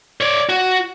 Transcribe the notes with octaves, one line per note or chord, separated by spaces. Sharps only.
C#5 D5
F#4